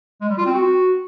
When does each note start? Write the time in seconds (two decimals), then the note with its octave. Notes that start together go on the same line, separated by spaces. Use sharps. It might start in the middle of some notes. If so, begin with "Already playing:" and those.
0.21 G#3
0.29 G3
0.38 F4
0.46 C4
0.54 F#4